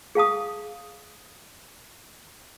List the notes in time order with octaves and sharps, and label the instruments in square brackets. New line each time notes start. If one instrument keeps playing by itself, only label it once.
[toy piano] G#4 F5 A5 D#6